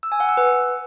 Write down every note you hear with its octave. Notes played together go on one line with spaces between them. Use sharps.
E6
G#5
F#5
E6
B4